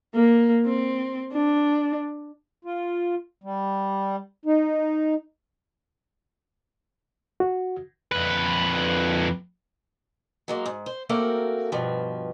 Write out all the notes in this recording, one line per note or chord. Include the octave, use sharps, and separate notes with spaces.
A#3
C4
D4
F4
G3
D#4
F#4
F2 B4
F#3 G#3 A#3
G#2
C5
A3 A#3 C4 F#4 A4 A#4
G2 B2 F3